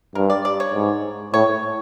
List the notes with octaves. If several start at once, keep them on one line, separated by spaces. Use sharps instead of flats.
G2 A#4
D5
D5
C#5
G#2
A2 C#5